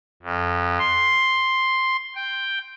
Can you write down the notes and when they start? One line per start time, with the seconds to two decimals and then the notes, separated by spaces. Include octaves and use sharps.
0.23 F2
0.79 C6
2.15 G5